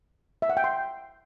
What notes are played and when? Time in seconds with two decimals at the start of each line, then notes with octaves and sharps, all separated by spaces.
0.42 E5
0.49 F#5
0.57 G5
0.64 C6